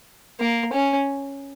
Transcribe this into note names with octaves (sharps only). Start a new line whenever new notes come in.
A#3
C#4